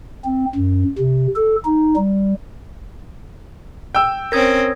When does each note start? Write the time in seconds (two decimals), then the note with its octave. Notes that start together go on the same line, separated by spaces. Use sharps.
0.25 C4
0.56 F#2
0.98 C3
1.36 A4
1.65 D#4
1.96 G3
3.95 G5 E6
4.32 C4 C#4 A#4 C#5 D#6 G#6 A#6